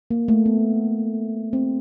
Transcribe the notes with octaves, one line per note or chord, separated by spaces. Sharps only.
A#3
A3
B3
C4